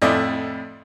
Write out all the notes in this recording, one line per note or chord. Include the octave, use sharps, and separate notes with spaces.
F2 A2 E4 D5 D#5